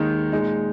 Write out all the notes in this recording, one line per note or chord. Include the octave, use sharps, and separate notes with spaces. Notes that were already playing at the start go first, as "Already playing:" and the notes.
Already playing: D#2 D#3 G#3 D#4
A#2 G#3 D#4